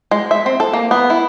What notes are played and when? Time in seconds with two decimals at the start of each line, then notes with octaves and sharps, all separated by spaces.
0.11 G#3
0.31 E5
0.46 C4
0.60 A4
0.73 A#3
0.91 B3
1.10 E4